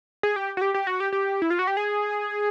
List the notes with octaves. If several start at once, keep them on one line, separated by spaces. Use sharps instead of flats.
G#4
G4
F#4
G4
G4
F#4
G4
G4
E4
F4
F#4
G4
G#4